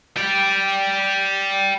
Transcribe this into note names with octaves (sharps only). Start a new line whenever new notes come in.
G4 D5